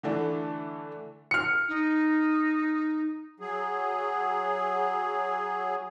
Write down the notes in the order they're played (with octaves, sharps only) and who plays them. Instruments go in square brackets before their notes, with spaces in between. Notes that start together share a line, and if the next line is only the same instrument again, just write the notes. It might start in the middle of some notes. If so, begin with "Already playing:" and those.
[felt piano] D3 E3 A3 D4
[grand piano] F6 C#7
[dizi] D#4
[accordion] F#3 G#4